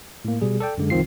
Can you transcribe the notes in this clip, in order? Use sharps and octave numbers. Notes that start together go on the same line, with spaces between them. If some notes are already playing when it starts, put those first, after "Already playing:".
A2 A#3
B2 G3 G#4
A4 D5 G5
F#2 D3 G#3
C2 D#3 F3 C4 F4 C7